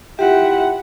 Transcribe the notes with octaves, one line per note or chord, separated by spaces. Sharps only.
E4 F4 G4 E5 F#5 G5